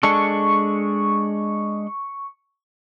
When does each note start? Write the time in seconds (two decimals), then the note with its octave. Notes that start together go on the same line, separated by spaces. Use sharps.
0.03 G#3 D4 A4 C#6